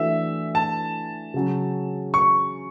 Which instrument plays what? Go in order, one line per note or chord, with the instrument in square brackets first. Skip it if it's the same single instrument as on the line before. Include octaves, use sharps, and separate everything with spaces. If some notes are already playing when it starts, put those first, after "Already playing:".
Already playing: [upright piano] E3 A3 D4 F#4 [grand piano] E5
[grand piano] A5
[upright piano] C#3 F#3 C#4
[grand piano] C#6